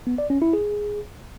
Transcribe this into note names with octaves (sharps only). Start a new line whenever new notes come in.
B3
D5
C#4
E4
G#4